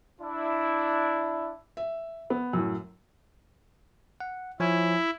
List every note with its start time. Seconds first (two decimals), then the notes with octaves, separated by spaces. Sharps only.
0.21 D4 E4
1.77 E5
2.30 B3
2.53 F#2 A2
4.20 F#5
4.60 F3 E4 C#5 G#5